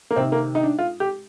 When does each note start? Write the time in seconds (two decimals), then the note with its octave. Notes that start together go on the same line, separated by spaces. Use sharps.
0.11 A#3
0.16 C3 C4
0.20 D#3
0.32 A#3
0.55 D#4
0.63 D4
0.79 F4
1.00 G4